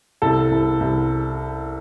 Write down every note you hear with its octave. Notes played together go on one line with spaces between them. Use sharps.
C2 A4
C2
C2